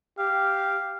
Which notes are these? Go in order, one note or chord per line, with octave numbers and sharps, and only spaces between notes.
G4 F5